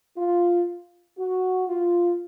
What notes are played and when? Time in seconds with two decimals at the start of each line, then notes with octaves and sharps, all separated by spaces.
0.17 F4
1.19 F#4
1.68 F4